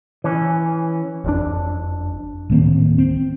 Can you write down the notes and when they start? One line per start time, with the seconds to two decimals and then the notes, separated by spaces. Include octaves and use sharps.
0.24 E3 C#4
1.24 F#1 F2 A2 D4
2.50 D1 D#3 A#3 C4
2.98 C4